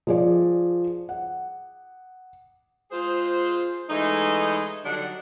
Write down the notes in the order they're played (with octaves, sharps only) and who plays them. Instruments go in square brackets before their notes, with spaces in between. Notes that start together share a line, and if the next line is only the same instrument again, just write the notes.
[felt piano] F3 G#4 D5
F#5
[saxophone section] G#3 F4 G#4 C5
E3 G#3 A3 D#4
D3 F#3 G3 D4 D#4 F#5